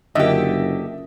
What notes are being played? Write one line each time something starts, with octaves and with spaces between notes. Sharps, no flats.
F#1 D3 C#4 F4 G4 A#4 D#5 E5